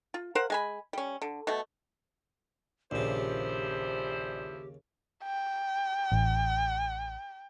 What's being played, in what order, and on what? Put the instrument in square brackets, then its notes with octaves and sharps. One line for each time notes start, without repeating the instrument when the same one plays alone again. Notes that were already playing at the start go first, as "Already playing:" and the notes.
[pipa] F4
A#4 C5 F5 F#5
G#3 G#5 B5
G3 C#4
D3
B2 A3
[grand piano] A#1 [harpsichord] D#2 C#3 [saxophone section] F3 E4 C5 [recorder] G4
[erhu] G5
[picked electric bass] A1